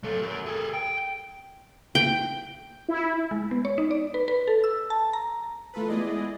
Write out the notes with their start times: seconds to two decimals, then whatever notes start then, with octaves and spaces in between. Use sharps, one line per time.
0.03 F#3 A4
0.22 F#4 A#4
0.46 G#4 A4
0.73 G5
1.95 G5
2.89 E4
3.31 G#3
3.51 B3
3.65 C#5
3.78 D#4
3.91 D5
4.14 B4
4.28 B4
4.48 A4
4.64 E6
4.90 A5
5.13 A#5
5.74 E3 A3 F4 A4 B4
5.88 G#3 B3 E4 G#4 D5 D#5